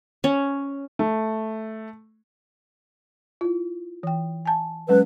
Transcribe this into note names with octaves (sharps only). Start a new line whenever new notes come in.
C#4
A3
E4 F4
E3 G5
G#5 A5
F#3 G#3 C#4 B4